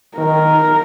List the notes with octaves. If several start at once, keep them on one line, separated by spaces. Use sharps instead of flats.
D#3 A#4